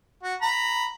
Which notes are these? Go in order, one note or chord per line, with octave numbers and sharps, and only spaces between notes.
F#4
A#5 B5